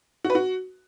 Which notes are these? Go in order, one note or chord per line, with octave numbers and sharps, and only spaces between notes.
F#4
B4
F#4